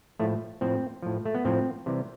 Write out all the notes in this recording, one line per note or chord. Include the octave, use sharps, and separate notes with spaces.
A2 F3 A3
A2 F3 C4
A2 F3
A3
B3
A2 F3 C4
C3 E3 G3